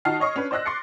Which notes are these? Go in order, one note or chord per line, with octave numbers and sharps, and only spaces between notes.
D#3 D#4 F#4 A5 F6 C7
C#5 D#5 C#6 D#6
C#4 D4 B4
C5 D5 D#5 E6 F#6 A#6
C6 D6 A6 C7 C#7